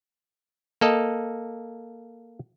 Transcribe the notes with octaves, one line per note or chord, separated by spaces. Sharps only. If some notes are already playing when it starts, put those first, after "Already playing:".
A#3 A4 D#5